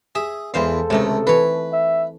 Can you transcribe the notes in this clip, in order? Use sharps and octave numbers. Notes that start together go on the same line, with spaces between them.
G#4 E5
E2 E3 G#3 A4 C5 F5
C#2 C3 D#3 A3 D#4
E3 B4 C#5
E5